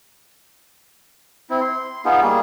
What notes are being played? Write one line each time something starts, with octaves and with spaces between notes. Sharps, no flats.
C4 E4
C6
B3 D#4 F4 G#4
G3 A#3 G#4